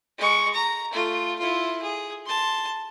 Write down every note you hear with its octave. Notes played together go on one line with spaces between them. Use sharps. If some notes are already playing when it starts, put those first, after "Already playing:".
G#3 C#6
A#5
A3 F4
E4 F4
G#4
A5 C6